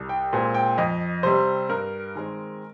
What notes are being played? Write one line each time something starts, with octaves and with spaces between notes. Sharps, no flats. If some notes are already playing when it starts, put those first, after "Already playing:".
Already playing: C2
G5
A#2 G#3 C4
G5
F2 D#5
C3 G3 C4 C5
G2 A#4
D#3 G#3 C4